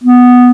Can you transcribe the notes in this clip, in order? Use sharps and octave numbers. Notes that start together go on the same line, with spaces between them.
B3